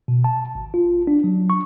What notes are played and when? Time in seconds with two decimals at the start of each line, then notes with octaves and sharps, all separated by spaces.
0.08 B2
0.24 A5
0.55 G#1
0.74 F4
1.07 D4
1.24 F#3
1.50 C#6